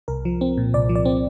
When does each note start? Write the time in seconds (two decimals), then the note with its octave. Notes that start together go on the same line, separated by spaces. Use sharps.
0.08 C2 A#4
0.25 F3
0.41 C4
0.57 A#2
0.74 C2 D5
0.89 F3
0.95 D5
1.05 C4